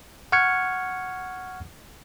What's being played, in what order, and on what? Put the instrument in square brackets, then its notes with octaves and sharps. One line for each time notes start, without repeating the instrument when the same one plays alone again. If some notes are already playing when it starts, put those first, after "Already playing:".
[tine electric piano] F#5 C#6 F6 G#6 C#7